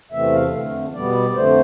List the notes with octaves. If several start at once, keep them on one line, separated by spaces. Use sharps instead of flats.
E2 C3 E3 A3 C4 E5
F5
F2 D3 A3
B2 G3 B3 D5
F2 D3 A3 C5